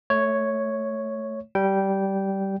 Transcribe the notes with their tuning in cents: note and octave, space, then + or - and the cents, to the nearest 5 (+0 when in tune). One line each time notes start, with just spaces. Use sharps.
A3 +0 C#5 +0 E5 -25
G3 -15 G5 -10